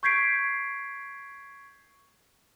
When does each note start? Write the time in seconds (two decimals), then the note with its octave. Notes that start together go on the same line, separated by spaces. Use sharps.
0.03 C#6 G6 G#6 B6 C7 D7